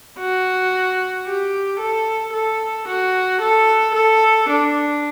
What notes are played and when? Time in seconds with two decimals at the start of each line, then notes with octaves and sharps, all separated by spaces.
0.19 F#4
1.26 G4
1.80 A4
2.33 A4
2.88 F#4
3.41 A4
3.94 A4
4.49 D4